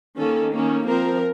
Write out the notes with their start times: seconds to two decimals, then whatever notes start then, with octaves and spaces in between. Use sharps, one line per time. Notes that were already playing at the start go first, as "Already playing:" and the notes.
0.18 D#3 A#3 C#4 A4
0.54 D#3 A#3 C#4
0.88 F3 C4 A#4